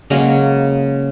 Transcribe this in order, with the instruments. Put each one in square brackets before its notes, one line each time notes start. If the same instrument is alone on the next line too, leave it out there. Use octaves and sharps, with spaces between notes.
[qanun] C#3 F#3 G#3 A#3